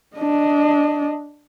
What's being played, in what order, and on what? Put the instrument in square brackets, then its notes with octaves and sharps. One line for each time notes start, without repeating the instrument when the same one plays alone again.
[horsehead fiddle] D4 D#5